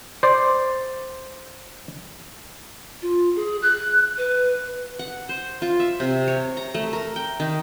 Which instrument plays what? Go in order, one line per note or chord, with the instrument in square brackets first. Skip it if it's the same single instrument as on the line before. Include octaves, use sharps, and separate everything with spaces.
[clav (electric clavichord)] C5 D5
[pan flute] F4
G#4
F#6
B4
[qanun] F#5
C5
F4
E5
C3
C#5
A#5
A3
A#4
G5
D#3